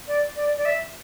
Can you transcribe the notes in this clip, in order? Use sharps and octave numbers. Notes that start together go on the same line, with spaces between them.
D5
D5
D5
E5